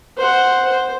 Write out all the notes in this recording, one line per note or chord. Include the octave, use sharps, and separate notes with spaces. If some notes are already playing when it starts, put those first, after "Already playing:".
C5 F#5
C5